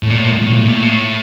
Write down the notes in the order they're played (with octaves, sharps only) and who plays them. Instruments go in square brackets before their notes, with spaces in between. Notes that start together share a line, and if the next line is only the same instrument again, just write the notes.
[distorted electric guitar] A2
A#2
A2
A#2
A2
A#2
A2
A#2
A2
A#2
A2
A#2
A2